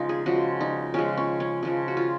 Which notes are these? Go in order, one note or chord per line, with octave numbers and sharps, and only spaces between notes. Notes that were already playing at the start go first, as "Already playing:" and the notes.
Already playing: C#3 F3 G#3 D#4 F4
G#4
C#3 F3 G#3 F#4
D#4
C#3 F3 G#3 C#4
C#4
C#4
C#3 F3 G#3
F#4
F4